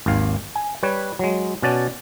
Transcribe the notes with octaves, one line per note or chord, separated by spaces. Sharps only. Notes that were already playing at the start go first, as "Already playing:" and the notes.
G#1 D#2 F5
G#5
G3 B4 C#5
F#3 G#3
B2 C#4 F#4 D5 A5